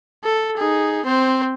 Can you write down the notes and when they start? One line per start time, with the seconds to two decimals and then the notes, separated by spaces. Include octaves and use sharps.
0.24 A4
0.57 D#4 G#4
1.06 C4 C5